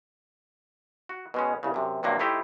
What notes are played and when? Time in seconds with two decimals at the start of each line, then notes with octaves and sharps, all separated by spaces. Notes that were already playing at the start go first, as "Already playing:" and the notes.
1.09 F#4
1.34 B2 G#3 C#4
1.63 C2 C#3
1.74 F#2 C3
2.03 G2 C3 F#3 A#3
2.19 A3 D#4 E4 G4 C5